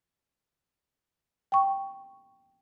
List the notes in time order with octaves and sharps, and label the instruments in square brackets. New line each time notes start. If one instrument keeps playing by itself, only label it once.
[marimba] G5 C#6